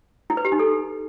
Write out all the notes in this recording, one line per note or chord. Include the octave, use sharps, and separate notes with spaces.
E4
B4
G4
D#4
A4